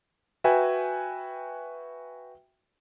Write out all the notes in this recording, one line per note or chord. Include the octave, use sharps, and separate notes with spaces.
F#4 B4 E5 G5 G#5